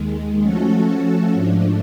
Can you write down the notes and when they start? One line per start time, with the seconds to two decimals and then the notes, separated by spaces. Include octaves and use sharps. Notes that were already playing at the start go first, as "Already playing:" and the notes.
Already playing: D#2 D#3 G#3
0.42 F3 A3 C#4 F#4 A4
1.34 G#2 F3 A3 D4